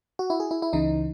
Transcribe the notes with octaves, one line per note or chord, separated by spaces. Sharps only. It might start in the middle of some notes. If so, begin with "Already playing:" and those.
F#4
E4
G#4
E4
E4
C#2 C#3 E3 D#4